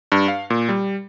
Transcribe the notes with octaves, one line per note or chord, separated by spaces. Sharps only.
G2
F5
A#2
G3